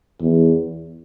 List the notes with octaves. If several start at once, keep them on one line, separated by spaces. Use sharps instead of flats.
E2